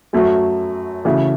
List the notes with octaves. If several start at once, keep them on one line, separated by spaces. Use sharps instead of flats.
F#2 F#3 A3 F#4
C#3 E3 A3 F#4